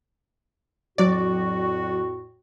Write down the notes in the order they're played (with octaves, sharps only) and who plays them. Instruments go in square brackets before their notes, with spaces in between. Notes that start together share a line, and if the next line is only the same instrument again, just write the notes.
[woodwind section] F2 A2 F#4 [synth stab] F#3 D5